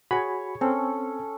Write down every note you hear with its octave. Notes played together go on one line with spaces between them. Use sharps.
F#4 G#4 C#5 G#5 B5
C4 C#4 A4